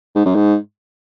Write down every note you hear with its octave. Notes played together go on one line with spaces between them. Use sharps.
G#2
F#2
G#2